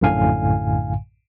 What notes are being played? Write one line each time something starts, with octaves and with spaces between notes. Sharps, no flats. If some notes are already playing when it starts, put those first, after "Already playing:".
A#1 F#2 A2 D3 F5 G#5